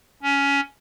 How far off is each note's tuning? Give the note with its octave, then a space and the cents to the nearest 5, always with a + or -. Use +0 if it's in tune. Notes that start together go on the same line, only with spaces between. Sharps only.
C#4 +15